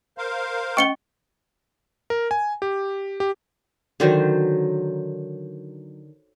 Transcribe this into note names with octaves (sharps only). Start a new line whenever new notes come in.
A#4 C5 F5
C#4 D#5 G5 C#6 C#7 G7
A#4
G#5
G4
G4
D3 D#3 F#3 C5